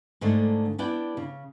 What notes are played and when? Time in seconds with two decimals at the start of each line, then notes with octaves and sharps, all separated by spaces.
0.21 G#2 D3 A3 A#3 D4
0.78 B3 D4 E4 D5 G5
1.17 C#3